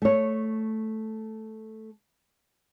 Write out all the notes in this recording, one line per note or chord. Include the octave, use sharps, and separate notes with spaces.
A3 C#5